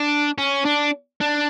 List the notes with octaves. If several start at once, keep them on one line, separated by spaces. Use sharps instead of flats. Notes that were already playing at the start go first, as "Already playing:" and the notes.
Already playing: D4
C#4
D4
D4